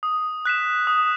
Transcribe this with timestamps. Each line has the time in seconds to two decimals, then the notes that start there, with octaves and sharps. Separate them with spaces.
0.03 D#6
0.45 F#6 B6 E7
0.87 D#6